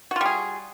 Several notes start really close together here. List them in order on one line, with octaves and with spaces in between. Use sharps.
F#4 F4 G3 G#4